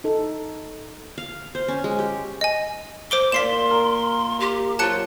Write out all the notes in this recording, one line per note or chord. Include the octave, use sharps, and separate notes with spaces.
D#4 A4
F5
C5
C#4
G#3
G4
D#5 G#5
C5 D6 D7 G7
A#2 F4 C6 B6 C7 E7
A#4
G4
F#3 F4 C5 A5 F#6 C#7